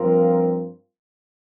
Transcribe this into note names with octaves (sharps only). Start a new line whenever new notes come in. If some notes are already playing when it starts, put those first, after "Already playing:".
Already playing: G2 F3 C4 F4 A#4